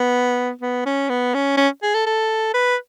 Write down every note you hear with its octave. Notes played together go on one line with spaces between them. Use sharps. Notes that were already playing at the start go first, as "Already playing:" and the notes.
Already playing: B3
B3
C#4
B3
C#4
C#4
G#4
A4
A4
B4